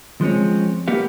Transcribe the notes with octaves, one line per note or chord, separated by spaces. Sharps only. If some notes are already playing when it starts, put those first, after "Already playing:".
F3 G#3 C4 C#4
A#3 B3 G4 F5